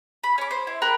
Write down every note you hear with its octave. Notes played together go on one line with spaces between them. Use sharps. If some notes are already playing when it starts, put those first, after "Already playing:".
B5
C#4 D6
C5
E4
A#4 G5 B5 F#6